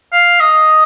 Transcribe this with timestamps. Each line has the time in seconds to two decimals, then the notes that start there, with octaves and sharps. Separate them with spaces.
0.13 F5
0.40 D#5